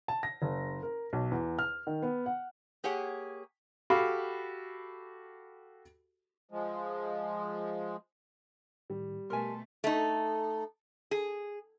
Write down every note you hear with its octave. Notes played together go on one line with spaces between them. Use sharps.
A5
A#6
F#1
A#4
B1
E2
F6
D#3
B3
F#5
A#3 G4 G#4 C#5 F#5
F#4 G4 A4 F5 B5
F3 G#3
A2 D#3 G3
B2 A3 A#4 G#5 A5 C6
A3 D#4
G#4